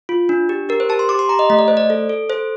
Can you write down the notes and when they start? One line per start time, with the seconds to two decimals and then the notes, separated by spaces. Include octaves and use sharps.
0.09 F4
0.29 D4
0.49 G4
0.69 G4 A#4
0.80 C5
0.89 G4 A5
0.99 C6
1.09 G4 D6
1.19 C6
1.29 G4 A#5
1.39 D#5
1.50 A3 D#5
1.59 D5
1.68 A3 C5
1.77 D5
1.90 A4
2.09 A4
2.30 A4 C5